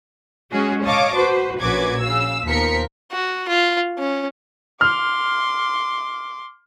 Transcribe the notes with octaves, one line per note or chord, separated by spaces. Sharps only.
G#3 C#4 F#4 G#4
C#5 D#5 F5 A5 C#6 D6
F#4 B4 C5
A#1 F#2 F#4 B4 D6 G#6
C#3 F5 E6
D#2 F3 B3 A#4 B6 C#7
F#4
F4
C#4
C6 D6 F6